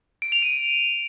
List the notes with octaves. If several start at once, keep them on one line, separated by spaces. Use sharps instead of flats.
D7
F7
D#7